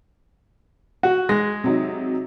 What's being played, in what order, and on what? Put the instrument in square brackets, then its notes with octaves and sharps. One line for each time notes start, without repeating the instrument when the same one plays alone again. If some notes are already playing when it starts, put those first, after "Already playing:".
[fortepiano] F#4
[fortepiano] G#3 [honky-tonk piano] A#6
[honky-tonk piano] C3 F#3 D#4